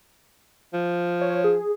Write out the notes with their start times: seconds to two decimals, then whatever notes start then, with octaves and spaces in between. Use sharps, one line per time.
0.74 F3
1.21 C#5
1.44 G#4